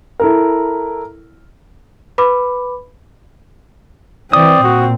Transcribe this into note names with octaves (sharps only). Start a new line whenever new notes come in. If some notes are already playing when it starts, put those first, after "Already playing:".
E4 A4 A#4
B4 B5 D6
E3 C4 D5 D#6
A#2 F#4